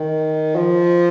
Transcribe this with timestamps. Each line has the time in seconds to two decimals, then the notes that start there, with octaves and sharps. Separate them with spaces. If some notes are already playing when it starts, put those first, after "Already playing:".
Already playing: D#3
0.56 F3